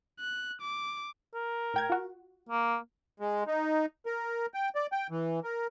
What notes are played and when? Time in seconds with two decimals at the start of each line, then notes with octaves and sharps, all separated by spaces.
0.20 F#6
0.61 D6
1.34 A#4
1.74 A2 G5 G#6
1.90 F4 F#4
2.49 A#3
3.20 G#3
3.47 D#4
4.06 A#4
4.54 G5
4.75 D5
4.92 G5
5.10 E3
5.44 A#4